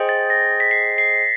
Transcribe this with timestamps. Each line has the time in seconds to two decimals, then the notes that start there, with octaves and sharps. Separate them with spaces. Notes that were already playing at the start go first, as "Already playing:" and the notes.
Already playing: G#4 C5 D#5 G5
0.09 A6
0.30 A#6
0.60 B6
0.71 C7
0.98 C7